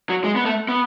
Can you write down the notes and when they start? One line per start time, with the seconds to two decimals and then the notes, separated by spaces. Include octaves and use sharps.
0.09 F#3
0.24 G#3
0.36 B3
0.46 A3
0.68 B3